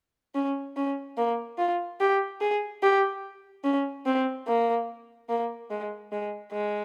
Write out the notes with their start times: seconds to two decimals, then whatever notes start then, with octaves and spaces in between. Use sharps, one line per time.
0.35 C#4
0.76 C#4
1.17 A#3
1.59 F4
2.00 G4
2.41 G#4
2.83 G4
3.64 C#4
4.06 C4
4.47 A#3
5.29 A#3
5.70 G#3
6.12 G#3
6.52 G#3